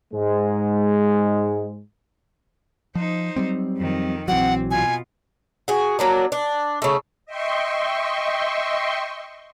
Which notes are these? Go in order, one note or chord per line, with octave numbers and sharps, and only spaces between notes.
G#2 G#3
F3 D#4 C5
F#3 G3 C4
F2 D#3
A#1 E3 F#3 C4 F#5
B2 F4 G#5
F#4 G#4
F#3 A#3 D4
D4
C#3 A3
D#5 E5 G5 C6 C#6